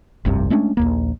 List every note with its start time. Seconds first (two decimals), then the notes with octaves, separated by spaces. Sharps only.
0.25 F1 C2 G2 C3
0.50 G#3 A3 C#4 D4
0.77 A#1 D#2 A#3